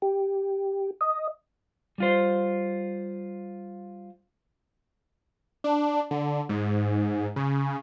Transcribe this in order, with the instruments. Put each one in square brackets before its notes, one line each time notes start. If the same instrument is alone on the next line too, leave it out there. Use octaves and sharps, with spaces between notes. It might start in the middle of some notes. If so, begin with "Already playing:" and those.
[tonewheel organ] G4
D#5
[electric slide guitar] G3 F4 C5
[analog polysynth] D4
D3
G#2
C#3